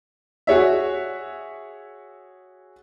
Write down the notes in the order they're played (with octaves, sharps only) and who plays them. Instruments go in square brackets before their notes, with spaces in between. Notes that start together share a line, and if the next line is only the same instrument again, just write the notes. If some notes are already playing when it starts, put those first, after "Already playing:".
[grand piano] F#4 G#4 C#5 E5